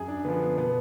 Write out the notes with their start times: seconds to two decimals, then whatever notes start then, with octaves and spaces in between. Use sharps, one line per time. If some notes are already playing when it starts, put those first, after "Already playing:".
Already playing: F#2 G#4
0.08 D4
0.25 D3 F3 B3
0.57 B2 B3